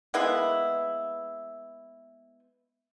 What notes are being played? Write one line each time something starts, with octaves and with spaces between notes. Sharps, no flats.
G#3 A#3 B3 E4